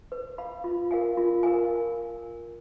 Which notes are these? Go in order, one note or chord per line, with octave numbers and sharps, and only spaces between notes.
B4
F5 B5
F4
A#4 F5 G#5
F4
A#4 F5 G#5